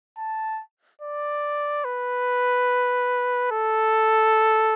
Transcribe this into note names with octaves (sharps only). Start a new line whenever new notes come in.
A5
D5
B4
A4